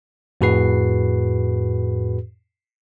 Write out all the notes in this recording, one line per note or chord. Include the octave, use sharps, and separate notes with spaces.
F2 A2 F#4 G#4 B4 C7